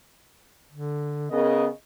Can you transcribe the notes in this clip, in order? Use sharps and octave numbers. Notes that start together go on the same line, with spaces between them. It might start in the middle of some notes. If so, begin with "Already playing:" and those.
D3
C#3 B3 A#4 D#5